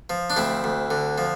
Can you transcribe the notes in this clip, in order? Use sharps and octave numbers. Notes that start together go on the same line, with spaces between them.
F3
D4
D2 C4 E4
D2
D3
F3